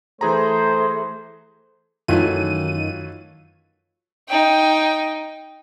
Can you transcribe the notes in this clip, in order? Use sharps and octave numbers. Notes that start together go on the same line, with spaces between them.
E3 A3 G#4 C5 A#5
F#2 D#3 E3 F#3 A3 F4 D#7
D#4 G5